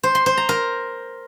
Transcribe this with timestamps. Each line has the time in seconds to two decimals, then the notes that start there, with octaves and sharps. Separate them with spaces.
0.03 C5
0.15 C6
0.26 C5
0.37 A#5
0.49 A#4